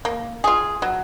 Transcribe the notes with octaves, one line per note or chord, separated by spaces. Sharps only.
A#3
F4 G#4
F#3